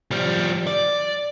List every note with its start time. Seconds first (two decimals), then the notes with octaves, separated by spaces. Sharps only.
0.11 F3 G3
0.67 D5